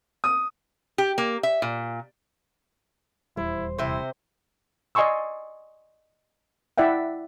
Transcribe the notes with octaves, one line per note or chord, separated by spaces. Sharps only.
D#6
G4
A#3
E5
A#2
D#1 E2 G3 E4 C5
C3 C4 E4 C5
D5 D#5 G#5 C6 C#6 E6
E4 D5 E5 F#5 G5